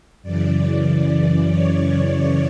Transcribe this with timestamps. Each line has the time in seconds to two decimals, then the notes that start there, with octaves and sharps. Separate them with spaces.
0.22 F#2 C#3 E3 D5
1.48 C#5